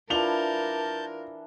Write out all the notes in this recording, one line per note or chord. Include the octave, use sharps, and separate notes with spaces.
E3 D4 F4 A#4 A5 G6 F7 G7